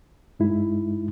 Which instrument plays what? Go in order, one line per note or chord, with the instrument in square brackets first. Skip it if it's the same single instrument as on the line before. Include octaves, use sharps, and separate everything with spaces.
[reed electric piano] G2 G#3 D#4 E4